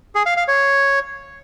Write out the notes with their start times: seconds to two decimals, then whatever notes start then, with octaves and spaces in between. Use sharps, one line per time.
0.15 G#4
0.26 F5
0.37 F5
0.48 C#5